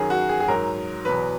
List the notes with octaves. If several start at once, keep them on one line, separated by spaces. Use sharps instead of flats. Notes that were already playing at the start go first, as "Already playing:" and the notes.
Already playing: F#2 D#3 F#3 G#4
F#4
G#4
G#4
G#2 F#3 A#4
E2 B2 F#3 B4